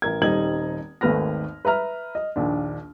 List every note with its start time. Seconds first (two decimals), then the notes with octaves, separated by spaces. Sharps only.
0.02 A1 A#4 G#6
0.22 D#1 G3 C4 D#4 G#6 F#7
1.01 G#1 D#2 A3 B4 F6 A#6
1.65 B4 E5 A#5 F6
2.15 D#5
2.36 A#1 D#2 D4